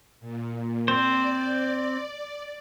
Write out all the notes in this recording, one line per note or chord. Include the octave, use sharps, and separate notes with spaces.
A#2
C4 C5 D5